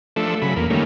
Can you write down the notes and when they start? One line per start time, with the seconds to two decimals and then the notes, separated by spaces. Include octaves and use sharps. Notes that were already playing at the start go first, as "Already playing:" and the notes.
0.16 F3 A3 D4 A4 E5
0.42 C#3 F#3 B5
0.56 E2 A#3
0.70 D#3 G3 A3 A#3 C#4